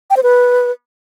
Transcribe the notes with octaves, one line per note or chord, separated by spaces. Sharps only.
G5
C5
B4